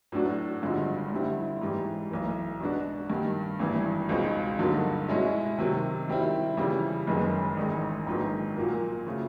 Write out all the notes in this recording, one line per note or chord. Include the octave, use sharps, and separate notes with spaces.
A2 F#3 B3 D4 F#4
G#1 G2 D3 F3 G#3
G2 D3 G3 C4 E4
G#2 E3 G3
B1 A2 E3
B2 G#3 B3 D4 F#4
G2 D#3 G3
G#1 G2 E3
C#2 B2 G#3 C4 D#4
G2 D3 F#3 A#3 D#4
B2 G#3 C#4 E4
C3 D#3 F#3
D#3 G3 C4 E4
F2 C#3 E3 G3
F#1 F#2 D#3 G#3 B3
A1 G#2 D#3 G#3
A#1 G#2 D#3 F#3 B3
A#2 F#3 A#3
C#3 F3 A3